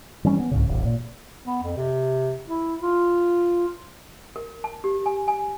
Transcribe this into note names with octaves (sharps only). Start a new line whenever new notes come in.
E3 G3 C#4
B3
C2 G#2 C#3
D#1 A1
A#2
B3
F2
C3
E4
F4
A#4
A5
G4
G#5
G#5